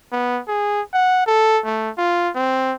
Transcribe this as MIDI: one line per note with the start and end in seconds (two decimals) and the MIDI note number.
0.12 0.41 59
0.48 0.82 68
0.94 1.22 78
1.27 1.60 69
1.65 1.90 57
1.98 2.30 65
2.36 2.74 60